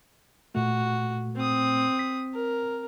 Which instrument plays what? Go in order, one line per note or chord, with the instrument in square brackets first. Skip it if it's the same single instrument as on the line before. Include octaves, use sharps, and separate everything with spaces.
[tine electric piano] A#2 A3 [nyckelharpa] F#4
[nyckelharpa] C4 D#6
[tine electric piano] B6
[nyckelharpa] A#4